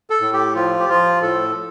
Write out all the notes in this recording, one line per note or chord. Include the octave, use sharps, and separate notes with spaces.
A4
A2
G4
F3 F4
G4
F3 F4
A2 A4